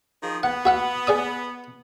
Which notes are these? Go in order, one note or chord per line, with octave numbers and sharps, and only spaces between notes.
D#3 F3 G#4
B3 F#5
F#4 E5 F#5
G#4 D5 D#6